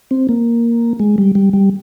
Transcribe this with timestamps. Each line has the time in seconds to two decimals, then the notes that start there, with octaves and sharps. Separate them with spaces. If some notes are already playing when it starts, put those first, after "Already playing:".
0.11 C4
0.29 A#3
1.00 G#3
1.18 G3
1.35 G3
1.53 G3